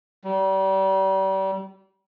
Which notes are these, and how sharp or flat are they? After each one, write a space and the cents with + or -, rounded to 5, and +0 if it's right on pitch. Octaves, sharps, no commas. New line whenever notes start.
G3 -35